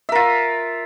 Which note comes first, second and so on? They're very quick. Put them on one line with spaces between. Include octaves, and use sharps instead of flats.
E5 A#4 F4